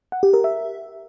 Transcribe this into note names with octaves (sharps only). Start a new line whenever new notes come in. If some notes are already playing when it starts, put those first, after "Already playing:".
F#5
G4
A#4
E5